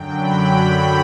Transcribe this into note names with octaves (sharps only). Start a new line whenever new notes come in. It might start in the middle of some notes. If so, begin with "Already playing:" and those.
Already playing: F#2 D3 F#3 G5
B5
B5